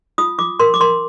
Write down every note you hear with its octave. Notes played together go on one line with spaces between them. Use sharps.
F4 D#6
F4 D6
A#4 C6
D6
A#4 C6